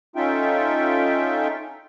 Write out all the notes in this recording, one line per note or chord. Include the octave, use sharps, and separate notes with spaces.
C#4 D#4 F4 A4 E5 G5